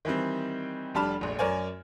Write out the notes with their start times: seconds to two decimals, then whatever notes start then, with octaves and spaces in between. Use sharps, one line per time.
0.05 D#3 E3 G3 C4
0.95 F1 G3 D4 A5 B5 F6
1.21 F1 A#1
1.39 F#2 A#4 C#5 D5 G#5